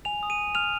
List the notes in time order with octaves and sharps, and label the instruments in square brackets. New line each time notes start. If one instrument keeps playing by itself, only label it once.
[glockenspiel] G#5 F7
D#6
D#7
D#6
F6 F7